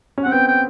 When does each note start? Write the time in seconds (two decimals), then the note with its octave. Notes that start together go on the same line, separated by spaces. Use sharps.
0.18 C#4
0.24 C4 F#5
0.32 B3 G5
0.48 G5